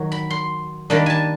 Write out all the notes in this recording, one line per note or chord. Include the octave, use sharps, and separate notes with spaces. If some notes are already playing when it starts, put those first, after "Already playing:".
Already playing: D#3 F#3
B5
C6
D#3 G3 A#3 D4 B5
G#5 A5